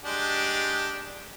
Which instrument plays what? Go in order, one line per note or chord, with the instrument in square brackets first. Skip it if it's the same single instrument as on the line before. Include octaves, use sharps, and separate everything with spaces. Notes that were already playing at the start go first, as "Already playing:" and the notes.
[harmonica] G#3 D4 G4